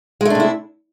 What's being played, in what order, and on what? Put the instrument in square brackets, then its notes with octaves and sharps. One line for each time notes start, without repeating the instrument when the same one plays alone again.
[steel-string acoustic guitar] G#3
A3
D4
C3
E4